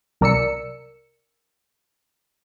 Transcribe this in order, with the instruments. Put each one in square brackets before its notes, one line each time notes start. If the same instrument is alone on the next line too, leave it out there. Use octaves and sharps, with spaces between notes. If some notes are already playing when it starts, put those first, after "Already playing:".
[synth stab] C2 A#4 D5 E6 C#7